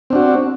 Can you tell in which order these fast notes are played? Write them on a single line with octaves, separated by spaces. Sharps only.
C4 D4 F#4